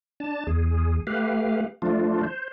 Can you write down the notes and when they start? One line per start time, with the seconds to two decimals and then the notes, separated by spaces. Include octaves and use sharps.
0.20 D4 A5
0.47 E2 G#4
1.07 A3 G4 B4 F5
1.82 F3 A3 D4 F4
2.23 C5